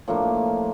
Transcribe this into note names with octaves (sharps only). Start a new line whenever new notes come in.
A2 F3 A#3 D4